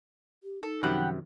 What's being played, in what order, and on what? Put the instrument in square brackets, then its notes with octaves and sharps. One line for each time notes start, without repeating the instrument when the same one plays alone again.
[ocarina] G4
[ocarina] D#4 [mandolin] A4
[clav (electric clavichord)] F#2 C3 [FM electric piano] D#3 F3 [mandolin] G4 F#5 B5